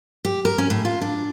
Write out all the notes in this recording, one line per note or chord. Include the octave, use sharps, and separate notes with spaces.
G4
A#4
C#4
A2
F4
D4